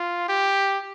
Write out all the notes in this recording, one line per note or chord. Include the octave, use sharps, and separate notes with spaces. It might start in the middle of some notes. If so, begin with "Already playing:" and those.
Already playing: F4
G4